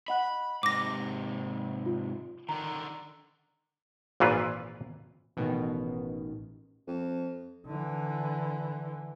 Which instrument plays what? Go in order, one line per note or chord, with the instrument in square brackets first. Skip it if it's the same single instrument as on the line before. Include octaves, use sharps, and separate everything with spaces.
[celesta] D#5 F#5 F#6 [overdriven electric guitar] B5
[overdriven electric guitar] G#2 C3 [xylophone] D6 A#6
[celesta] F4
[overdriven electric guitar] D3 D#3 [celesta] A#5
[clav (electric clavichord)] G#1 A#2 E3 F4 B4
[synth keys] A1 B2 D#3
[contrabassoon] F2
[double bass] D3 E3